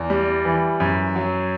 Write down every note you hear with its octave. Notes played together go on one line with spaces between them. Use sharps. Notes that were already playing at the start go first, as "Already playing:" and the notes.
Already playing: E2
G3
E3
F#2
F#3